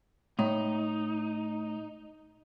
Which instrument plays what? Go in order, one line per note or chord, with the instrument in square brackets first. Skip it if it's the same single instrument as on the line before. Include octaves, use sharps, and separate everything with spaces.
[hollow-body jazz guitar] A2 [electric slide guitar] D#4